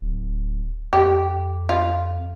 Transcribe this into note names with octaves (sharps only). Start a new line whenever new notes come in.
D1
F2 G4
F4